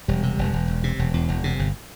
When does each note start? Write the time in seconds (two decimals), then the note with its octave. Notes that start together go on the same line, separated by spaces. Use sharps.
0.08 E1 G3
0.23 C3
0.39 E1
0.53 E1
0.68 E1
0.84 C3
0.99 E1
1.14 E2
1.29 E1
1.44 C3
1.59 G1